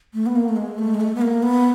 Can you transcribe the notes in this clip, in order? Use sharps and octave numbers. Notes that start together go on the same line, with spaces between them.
A3
B3
A#3
A3
G#3
A3
G#3
A3
B3
A#3
B3